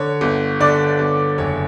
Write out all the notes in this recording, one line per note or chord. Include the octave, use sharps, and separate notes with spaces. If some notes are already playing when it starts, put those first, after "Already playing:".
Already playing: D3 C#5
G1
D3 D5
G1
F#1 C#5